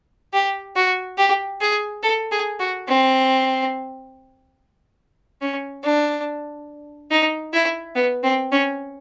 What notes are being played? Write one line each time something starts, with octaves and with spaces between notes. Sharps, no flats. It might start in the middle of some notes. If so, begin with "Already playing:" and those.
G4
F#4
G4
G#4
A4
G#4
F#4
C4
C#4
D4
D#4
E4
B3
C4
C#4